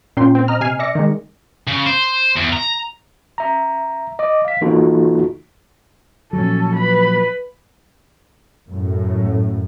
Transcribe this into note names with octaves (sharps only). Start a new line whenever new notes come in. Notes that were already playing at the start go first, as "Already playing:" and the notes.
A#2 C#4 G5 C6
C4
D#5 A#5 F6
C3 G#5 F6 C7
D5 E5 D6 A#6 C#7
D#3 G#3
C#3
C5
E2
A#5
E5 A#5
D#5 D6
F5 B6
E3 A#3 D#4 F4 F#4 A4
A#2 F3 F#3 C#4 A4
B4 B5
F#2 A2